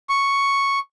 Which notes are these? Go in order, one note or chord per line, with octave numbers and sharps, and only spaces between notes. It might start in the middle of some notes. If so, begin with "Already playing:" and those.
C#6